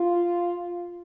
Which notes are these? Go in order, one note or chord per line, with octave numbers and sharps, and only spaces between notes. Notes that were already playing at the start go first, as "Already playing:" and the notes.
Already playing: F4